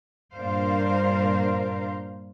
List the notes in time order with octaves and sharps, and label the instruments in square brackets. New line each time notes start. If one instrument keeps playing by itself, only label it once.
[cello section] G2 A#2 D4 A#4 C5 F5